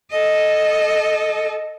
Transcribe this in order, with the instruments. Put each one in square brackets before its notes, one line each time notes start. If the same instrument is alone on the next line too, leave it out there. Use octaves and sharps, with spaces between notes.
[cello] A4 D#5